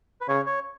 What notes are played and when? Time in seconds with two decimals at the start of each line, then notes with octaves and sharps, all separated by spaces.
0.21 B4
0.28 C#3 C#5
0.46 C#5